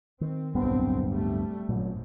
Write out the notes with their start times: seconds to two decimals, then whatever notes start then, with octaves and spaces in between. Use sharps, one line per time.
0.21 D#3 C4
0.55 D1 B1 G2 A#2 B3 C4
1.09 G3 A3
1.69 G#1 F#2 A#2 F#3